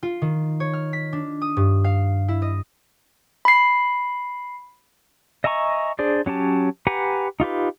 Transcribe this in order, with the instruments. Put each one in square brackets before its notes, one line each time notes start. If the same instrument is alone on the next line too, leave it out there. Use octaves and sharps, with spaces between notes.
[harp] F4
D#3
C#5
F6
B6
D4
D#6
G2
F5
E4
D#5
[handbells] B5 C7
[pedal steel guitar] D#5 E5 G#5 A#5 C#6
D4 G#4 C5 D5
F#3 C#4 G4 A5
G4 B4 F#5 G#5 A#5
D#4 F4 G4 B4